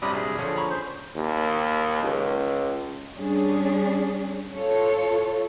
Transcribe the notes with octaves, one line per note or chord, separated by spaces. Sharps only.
A#1 F#2 C3 G3 D4 D5 B5 D#6
G#4
D3 F3 C#4
A#5 B5 C#6
C5
D#2
C#2
G3 C#4 D4 G#4
F4 A4 C#5